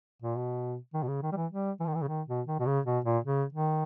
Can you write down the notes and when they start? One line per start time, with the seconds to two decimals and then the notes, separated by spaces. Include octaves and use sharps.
0.22 A#2
0.36 B2
0.94 D#3
1.03 B2
1.08 C#3
1.22 D#3
1.32 G3
1.37 E3
1.51 G3
1.80 E3
1.87 D#3
1.95 E3
2.02 C#3
2.09 D#3
2.28 B2
2.47 D#3
2.60 B2
2.66 C#3
2.86 B2
3.05 A#2
3.24 C#3
3.53 D#3